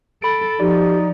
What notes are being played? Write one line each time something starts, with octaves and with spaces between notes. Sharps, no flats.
A4 B5 D7
F3 D#4 G4 D5